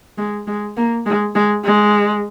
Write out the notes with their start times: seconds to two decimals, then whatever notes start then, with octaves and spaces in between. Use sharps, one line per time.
0.18 G#3
0.47 G#3
0.77 A#3
1.06 G#3
1.35 G#3
1.64 G#3